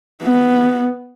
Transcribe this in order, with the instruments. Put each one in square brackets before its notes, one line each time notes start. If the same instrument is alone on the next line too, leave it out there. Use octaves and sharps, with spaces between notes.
[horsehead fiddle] B3